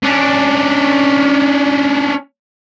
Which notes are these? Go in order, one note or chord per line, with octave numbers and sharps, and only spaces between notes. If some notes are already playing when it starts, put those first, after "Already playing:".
C#4 D4